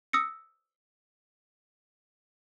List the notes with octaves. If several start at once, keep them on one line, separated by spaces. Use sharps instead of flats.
D#6 E6 A#6 C#7